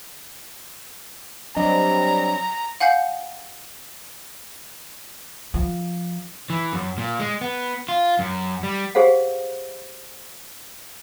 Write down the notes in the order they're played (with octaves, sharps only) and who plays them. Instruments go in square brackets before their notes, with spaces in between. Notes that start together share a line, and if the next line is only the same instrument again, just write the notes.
[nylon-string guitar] F#3 D4 D#5 [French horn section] G3 C4 [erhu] A#5
[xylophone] F5 F#5 G#5 G6 C7 C#7
[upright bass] F3
[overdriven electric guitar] E3
F#2
A#2
G#3
B3
F4
F#2
G3
[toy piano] G4 G#4 C5 F5 F#5